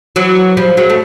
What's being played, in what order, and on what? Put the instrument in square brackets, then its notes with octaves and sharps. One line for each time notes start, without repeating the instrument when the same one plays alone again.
[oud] E3 F#3
F3 G3
F#3 G#3
A3